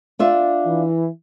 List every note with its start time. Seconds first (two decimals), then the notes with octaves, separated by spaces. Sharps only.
0.19 D4 F4 E5
0.65 E3